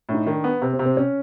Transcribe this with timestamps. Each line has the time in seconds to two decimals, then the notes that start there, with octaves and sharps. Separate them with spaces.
0.09 A2 D4
0.15 D#4
0.26 D#3 D4
0.44 B3
0.62 C3 C4
0.73 C4
0.79 C3
0.86 C4
0.97 C#4